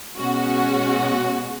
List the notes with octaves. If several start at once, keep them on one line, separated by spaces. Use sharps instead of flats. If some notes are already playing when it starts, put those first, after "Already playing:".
B2 G#3 C#4 F#4